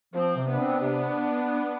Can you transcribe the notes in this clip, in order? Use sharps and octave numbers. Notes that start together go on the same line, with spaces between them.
F3 C4
C3
B3 D4
C4
C3